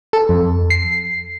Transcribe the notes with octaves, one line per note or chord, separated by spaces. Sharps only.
A4
F2
C7